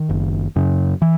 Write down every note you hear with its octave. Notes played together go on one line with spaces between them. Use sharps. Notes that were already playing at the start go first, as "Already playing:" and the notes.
Already playing: D#3
F#1
F#2 C#3
E3